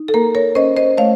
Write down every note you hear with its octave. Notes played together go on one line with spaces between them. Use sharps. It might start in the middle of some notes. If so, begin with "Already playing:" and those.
Already playing: D#4
A4
A#3 A#4
A#4 C#5
C#4 C5 D#5
C5 D#5
A3 C#5 F5